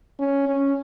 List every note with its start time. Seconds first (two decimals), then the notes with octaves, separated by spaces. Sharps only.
0.19 C#4
0.47 C#4